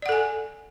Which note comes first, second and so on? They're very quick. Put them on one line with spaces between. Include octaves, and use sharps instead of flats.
D5 F#5 A4 G#5